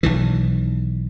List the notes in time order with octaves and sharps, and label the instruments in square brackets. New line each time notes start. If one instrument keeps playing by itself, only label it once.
[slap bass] B1 D#3 E3